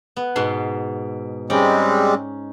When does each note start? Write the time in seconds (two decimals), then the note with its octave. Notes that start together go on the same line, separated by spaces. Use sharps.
0.17 B3
0.36 G#2 B2 C6
1.50 G3 G#3 C4 C#4 D#4 D5